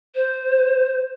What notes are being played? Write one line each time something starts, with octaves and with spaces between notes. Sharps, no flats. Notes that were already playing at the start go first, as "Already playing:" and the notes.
C5